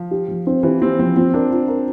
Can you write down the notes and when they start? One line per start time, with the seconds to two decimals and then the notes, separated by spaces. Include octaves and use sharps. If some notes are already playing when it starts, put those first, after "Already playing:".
Already playing: F3
0.11 G4
0.28 F3
0.47 C4
0.63 E3 G4
0.82 C4 G4
0.99 F3 C4
1.16 C4 F4
1.34 D4 A#4
1.51 F4
1.68 A#4